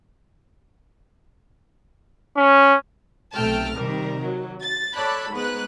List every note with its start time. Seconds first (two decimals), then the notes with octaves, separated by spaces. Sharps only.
2.37 C#4
3.35 B1 C3 A3 G5 A5 F6
3.75 C3 D#3 G3 A#4
4.21 F#3
4.63 A6
4.95 A4 C#5 D5 A5 B5 F#6
5.32 G#2 G#3 B3 B4 F#6